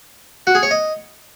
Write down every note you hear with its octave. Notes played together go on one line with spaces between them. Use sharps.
F#4
G#4
C#5
D#5